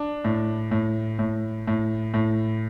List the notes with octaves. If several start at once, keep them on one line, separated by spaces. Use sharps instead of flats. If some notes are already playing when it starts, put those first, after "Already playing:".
Already playing: D4
A2
A2
A2
A2
A2